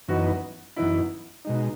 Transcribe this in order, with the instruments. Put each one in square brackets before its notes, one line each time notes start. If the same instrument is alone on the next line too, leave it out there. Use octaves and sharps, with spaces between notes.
[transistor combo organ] F#2 E3 B3 D#4 [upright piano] F#4
[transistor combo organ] F#2 E3 B3 D#4 [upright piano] E4
[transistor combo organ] B2 G#3 D#4